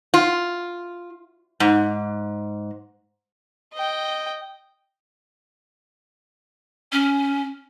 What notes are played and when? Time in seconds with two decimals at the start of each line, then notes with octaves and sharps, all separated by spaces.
0.14 F4
1.60 G#2
3.74 D#5 G5
6.92 C#4